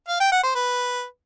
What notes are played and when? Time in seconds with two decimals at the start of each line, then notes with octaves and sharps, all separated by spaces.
0.08 F5
0.20 G5
0.32 F#5
0.44 C5
0.55 B4